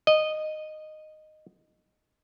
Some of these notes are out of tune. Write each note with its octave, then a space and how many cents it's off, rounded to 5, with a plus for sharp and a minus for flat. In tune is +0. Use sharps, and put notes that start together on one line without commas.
D#5 -10